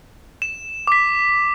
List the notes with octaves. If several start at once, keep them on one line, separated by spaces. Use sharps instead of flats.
E7
D6 B6